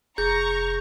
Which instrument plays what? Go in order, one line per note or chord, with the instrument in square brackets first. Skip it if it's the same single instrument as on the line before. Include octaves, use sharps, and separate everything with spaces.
[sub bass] F1 [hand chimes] G#4 [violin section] A#5 C#6 [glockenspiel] G6